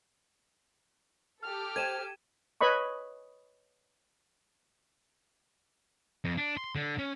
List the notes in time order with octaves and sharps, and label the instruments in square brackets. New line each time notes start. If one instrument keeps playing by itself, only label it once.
[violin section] G4 A4 [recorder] F6
[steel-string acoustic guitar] C5 G5 [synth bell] G#6 D#7 E7
[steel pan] B4 C#5 D#5 B5 C#6
[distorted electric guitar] F2
D4
C6
D3
C#4